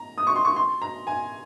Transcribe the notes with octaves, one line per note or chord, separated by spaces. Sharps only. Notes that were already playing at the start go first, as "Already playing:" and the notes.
Already playing: A#5
D#6
C#6
C6
C#6
C6
A#5
G#5